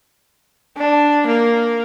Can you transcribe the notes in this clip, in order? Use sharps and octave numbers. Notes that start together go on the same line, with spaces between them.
D4
A#3